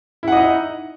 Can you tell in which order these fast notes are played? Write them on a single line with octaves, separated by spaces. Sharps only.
E4 F#5 D#5 D#4